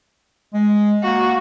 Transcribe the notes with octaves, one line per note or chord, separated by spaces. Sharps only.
G#3
A#3 F#4